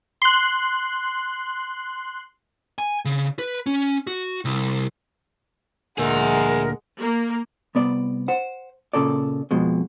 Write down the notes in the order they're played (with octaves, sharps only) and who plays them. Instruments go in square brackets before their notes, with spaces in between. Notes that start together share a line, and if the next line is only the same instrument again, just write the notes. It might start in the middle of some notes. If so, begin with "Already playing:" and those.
[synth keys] C6 F#6
[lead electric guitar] G#5
C#3
B4
C#4
F#4
C2
[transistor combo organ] D2 A#2 [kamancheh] G#3 F#5 [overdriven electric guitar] G#4 E5 [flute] A#4
[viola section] A#3
[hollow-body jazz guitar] C2 B3 D5
C5 F#5
A#2 C#3 A4 D5
F2 B2 G#3